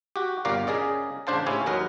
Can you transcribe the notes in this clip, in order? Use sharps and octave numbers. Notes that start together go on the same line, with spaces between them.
F#4 G4
G1 A#2 G4 A#4 D5 F5
C#3 G#4 A#4 D5 D#5
A1 C#3 D4 C5 F5 A5
A2 C#3 C#4 E4 G4 G#5
D#2 F#3 D#4 A#4 B4